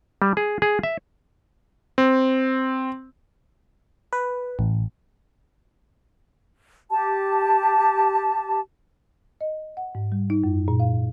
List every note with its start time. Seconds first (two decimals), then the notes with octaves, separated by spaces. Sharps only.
0.22 G3
0.37 G#4
0.62 G#4
0.83 E5
1.98 C4
4.13 B4
4.59 A1
6.92 G4 A5
9.41 D#5
9.77 F#5
9.95 G#2
10.12 G3
10.30 D#4
10.44 F#2
10.68 A#2
10.80 F5